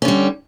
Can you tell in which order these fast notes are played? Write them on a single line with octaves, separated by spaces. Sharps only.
C#4 D3 G3